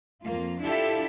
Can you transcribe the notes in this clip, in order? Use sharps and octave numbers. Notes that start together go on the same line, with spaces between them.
F2 A#3 F4
D4 E4 F4 G4 A4 E5